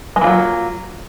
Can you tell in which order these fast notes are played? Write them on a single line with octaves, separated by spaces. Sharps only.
G#3 A#3 E3 F4 F#3